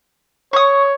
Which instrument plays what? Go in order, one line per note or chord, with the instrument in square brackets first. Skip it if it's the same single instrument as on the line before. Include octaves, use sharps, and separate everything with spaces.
[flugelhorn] C#5 [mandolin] C#6 D#6